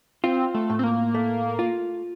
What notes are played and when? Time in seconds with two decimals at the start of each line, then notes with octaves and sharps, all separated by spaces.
0.24 C4 F4
0.54 A3
0.70 A2
0.79 C4
0.83 A#3
1.14 A3
1.59 F4